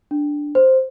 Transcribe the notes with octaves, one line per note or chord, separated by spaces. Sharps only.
D4
C5